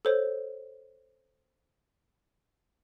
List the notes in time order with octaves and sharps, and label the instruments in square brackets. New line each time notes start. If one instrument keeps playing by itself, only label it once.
[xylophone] A4 C5 C#5